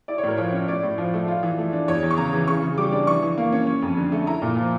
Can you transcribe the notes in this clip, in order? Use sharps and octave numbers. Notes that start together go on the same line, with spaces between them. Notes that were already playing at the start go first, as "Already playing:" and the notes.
E4 D5
C#5
A2 A#4
F3 C#5
C#4
A2 D5
A2
F3
A3
F4
E3
A3
D4
E2 C#5
E2
C#6
C#3 A#5
E3
C#3 C#6
C#3
G3 D6
D4
E3 C#6
E3
A#3
C#4
C#4
F2
D3
A3
E4 A#5
A#2
F3